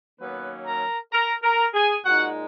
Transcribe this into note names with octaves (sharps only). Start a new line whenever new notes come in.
D#3 F#3 A#3 B3 C#4 B4
A#4 A#5
A#4 A#5
A#4 A#5
G#4 G#5
A#2 G#3 D#4 F#4 F#5